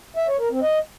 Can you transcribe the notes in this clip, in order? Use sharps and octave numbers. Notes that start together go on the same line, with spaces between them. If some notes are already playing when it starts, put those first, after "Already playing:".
E5
C#5
A#4
C4
D#5